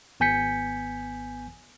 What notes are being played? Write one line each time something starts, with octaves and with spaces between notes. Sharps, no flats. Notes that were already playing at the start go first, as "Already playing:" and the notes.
G#1 B3 G#5 G6 B6 C#7